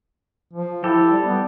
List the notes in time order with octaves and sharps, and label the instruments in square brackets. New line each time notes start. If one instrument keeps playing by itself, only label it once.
[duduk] F3
[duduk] E4 [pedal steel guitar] G4 A4
[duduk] G3
B3